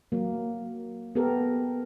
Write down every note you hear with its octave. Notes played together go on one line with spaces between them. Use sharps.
F#3 A#3
B3 G4 A4 A#4